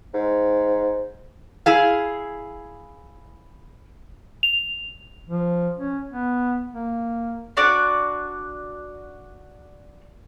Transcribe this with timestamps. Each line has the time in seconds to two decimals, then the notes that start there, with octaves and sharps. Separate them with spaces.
0.14 G#2
1.66 E4 G#4 F5
4.43 F7
5.29 F3
5.77 C#4
6.10 B3
6.73 A#3
7.57 D4 F#4 D5